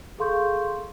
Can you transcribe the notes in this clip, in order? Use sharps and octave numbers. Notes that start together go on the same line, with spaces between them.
G#4 A4 F5 C6 C#6 G6